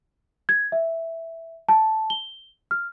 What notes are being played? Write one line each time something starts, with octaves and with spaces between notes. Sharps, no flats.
G#6
E5
A5
G7
F6